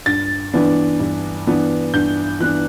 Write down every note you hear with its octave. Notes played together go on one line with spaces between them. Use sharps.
G2 A6
E3 B3 D4
G2
E3 B3 D4
G2 G6
E3 B3 D4 F#6